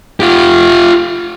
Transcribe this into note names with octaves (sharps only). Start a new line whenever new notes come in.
F4 G4